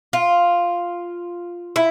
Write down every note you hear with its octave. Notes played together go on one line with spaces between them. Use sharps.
F4
E4